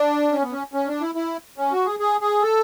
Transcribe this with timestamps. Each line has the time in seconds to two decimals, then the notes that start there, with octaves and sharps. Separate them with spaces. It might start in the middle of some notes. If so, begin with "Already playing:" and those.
Already playing: D4
0.32 C#4
0.42 B3
0.52 C#4
0.74 C#4
0.87 D4
1.01 E4
1.15 E4
1.58 C#4
1.72 F#4
1.86 G#4
1.99 G#4
2.21 G#4
2.42 A4